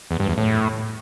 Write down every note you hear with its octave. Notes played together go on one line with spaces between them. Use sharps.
E2
G2
E2
A2